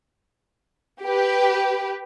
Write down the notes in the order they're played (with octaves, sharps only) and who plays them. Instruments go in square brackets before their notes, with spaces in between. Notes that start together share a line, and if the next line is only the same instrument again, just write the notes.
[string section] G4 B4